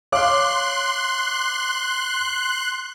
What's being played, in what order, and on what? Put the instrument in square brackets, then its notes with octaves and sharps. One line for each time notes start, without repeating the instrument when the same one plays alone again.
[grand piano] C#5 F5 D6 [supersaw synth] C6 F#6